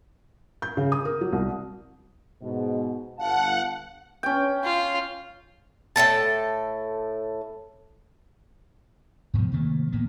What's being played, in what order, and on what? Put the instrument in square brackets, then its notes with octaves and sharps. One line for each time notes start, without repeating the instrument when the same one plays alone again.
[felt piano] G6
C#3
D#6
A#4
F#3
C2
[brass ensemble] G#2 B2
[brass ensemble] G1 F5 A5 [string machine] F#5
[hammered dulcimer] C#4 G5
[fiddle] F4
[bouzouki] A2 C#3 A4 A5
[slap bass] G#2 B2 E3 F3
C3 D#3 A3 A#3
A2 F3 A#3 B3